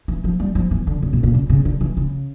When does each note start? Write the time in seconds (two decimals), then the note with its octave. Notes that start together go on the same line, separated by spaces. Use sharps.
0.08 E3
0.24 F3
0.40 G3
0.55 F3
0.71 E3
0.87 D3
1.02 C#3
1.13 A#2
1.23 A#2
1.34 C#3
1.50 C#3
1.65 D3
1.81 E3
1.97 C#3